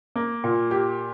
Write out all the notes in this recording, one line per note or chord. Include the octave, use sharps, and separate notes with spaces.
A#3
A#2
G4